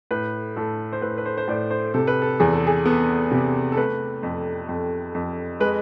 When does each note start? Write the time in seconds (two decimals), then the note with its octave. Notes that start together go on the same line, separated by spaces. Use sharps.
0.11 A2 B4
0.56 A2 A4
0.92 C5
1.02 A2 B4
1.18 B4
1.25 C5
1.37 C5
1.48 A2 D5
1.71 C5
1.94 C3 A4
2.07 B4
2.22 A4
2.40 E2 G#4
2.53 A4
2.67 G#4
2.85 B3 A4
3.31 C3
3.72 A4
3.77 A3 B4
4.23 F2
4.69 F2
5.15 F2
5.60 G#3 B4